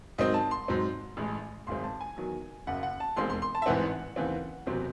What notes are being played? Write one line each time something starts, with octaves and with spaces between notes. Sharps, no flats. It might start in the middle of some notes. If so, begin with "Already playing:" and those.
G#2 D#3 F#3 C4 D#5
A5
C6
G#2 F#3 C4
A1 A2 G#3
G#1 F#2 C#3 G#3 C4 C6
A5
G#5
E2 D#3 F#3
F#1 F#2 C#3 F#5
F#5
A5
E1 D#2 D#3 G#3 C4 C6
C6
C6
A5
E5
A1 G#2 E3 C4 F#5
D#2 C#3 E3 C4
F#1 E2 C3 F#3 C4